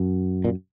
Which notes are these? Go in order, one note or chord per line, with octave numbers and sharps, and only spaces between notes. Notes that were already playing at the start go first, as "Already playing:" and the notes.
Already playing: F#2
A#2